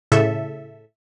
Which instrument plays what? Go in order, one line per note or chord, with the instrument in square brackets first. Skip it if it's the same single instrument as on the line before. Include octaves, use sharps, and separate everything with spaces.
[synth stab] A2 C#3 A4 E5